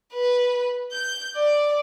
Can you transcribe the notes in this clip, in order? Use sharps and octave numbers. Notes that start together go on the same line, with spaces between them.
B4
G6
D5